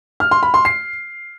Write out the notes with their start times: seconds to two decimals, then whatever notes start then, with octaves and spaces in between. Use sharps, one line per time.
0.20 F6
0.31 C6
0.43 B5
0.54 C6
0.65 C7